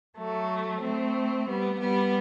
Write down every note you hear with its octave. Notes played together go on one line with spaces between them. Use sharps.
F#3 A3
A3 C4
G3 B3
G3 B3